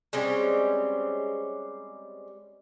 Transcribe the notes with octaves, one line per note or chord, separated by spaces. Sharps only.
G3 G#3 C4 C#4